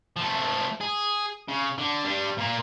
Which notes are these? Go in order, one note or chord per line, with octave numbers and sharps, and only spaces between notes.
F3 A3
G#4
C#3
D3
G3 D4
A#2 A#3